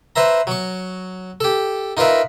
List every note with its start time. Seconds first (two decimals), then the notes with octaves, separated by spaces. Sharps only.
0.16 B4 C5 E5 A#5
0.47 F#3 C#6
1.41 G4 A4
1.97 D#4 F4 A#4 B4 E5